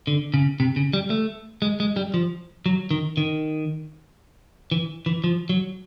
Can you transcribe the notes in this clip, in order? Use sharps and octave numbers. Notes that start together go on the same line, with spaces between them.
D3
C#3
C3
C#3
G3
A3
G#3
G#3
G3
F3
F#3
D#3
D#3
E3
E3
F3
F#3